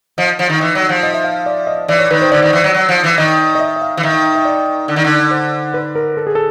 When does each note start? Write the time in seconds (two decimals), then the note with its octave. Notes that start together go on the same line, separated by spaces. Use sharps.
0.18 F3 D#5
0.39 F3
0.50 D#3
0.60 E3 D#5
0.75 F#3
0.89 F3
1.03 D#5
1.14 E5
1.24 F5
1.46 D5
1.67 D#5
1.88 E3 D5
1.99 C#5
2.10 D#3 B4
2.22 C5
2.32 D3 D5
2.42 D#3
2.53 E3
2.64 F#3
2.74 F#3
2.89 F3
3.04 E3
3.18 D#3 D#5
3.55 D#5
3.60 E5
3.76 E5
3.82 F5
3.97 E3
4.03 D#3 E5
4.13 E5
4.24 E5
4.35 E5
4.45 D5
4.88 D3
4.96 D#3
5.05 D3
5.31 C5
5.74 B4
5.95 A#4
6.17 A4
6.27 G#4
6.35 A4